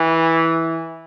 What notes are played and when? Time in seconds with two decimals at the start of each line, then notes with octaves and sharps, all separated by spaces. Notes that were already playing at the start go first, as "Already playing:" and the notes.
Already playing: E3